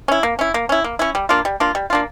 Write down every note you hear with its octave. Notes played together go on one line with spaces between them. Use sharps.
C#4 E4
A#3
C#4 E4
A#3
C#4 E4
A#3
C#4 E4
G3
A#3 D4 F4
G3
A#3 D4 F4
G3
A#3 D4 F4